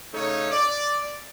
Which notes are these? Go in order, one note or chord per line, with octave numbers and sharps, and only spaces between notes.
C#3 A3 C#4 D#4 C#5
D5